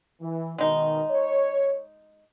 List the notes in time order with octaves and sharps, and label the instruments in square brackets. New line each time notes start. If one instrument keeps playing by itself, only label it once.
[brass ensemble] E3
[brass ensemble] B2 D#3 [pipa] G#3 D#4
[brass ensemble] C#5